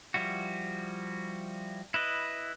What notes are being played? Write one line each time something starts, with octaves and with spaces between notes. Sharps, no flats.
F3 G3 E4 F#4
E4 B4 D#5